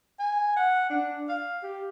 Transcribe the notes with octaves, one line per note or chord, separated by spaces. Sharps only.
G#5
F#5
D4
F5
G4